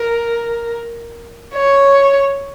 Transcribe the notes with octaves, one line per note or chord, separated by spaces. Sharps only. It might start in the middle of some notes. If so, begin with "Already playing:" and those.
Already playing: A#4
C#5